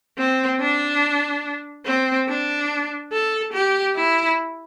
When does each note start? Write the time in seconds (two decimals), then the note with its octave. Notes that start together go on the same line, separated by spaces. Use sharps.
0.18 C4
0.60 D4
1.85 C4
2.28 D4
3.12 A4
3.53 G4
3.96 E4